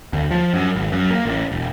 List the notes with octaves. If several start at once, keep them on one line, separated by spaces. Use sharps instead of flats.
D2
F3
F#2
G#1
F#2
A#3
A1
E1